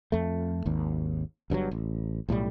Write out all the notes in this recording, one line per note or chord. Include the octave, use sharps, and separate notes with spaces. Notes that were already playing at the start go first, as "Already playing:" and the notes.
F2 A3
G#1 D#2
G1 G2 C3 F#3
A1
B1 A2 F#3 G3